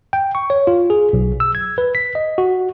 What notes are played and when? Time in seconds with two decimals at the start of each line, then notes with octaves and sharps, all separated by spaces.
0.13 G5
0.35 C#6
0.50 C#5
0.67 F4
0.90 G#4
1.13 B1
1.40 E6
1.55 G#6
1.78 B4
1.95 B6
2.15 D#5
2.38 F#4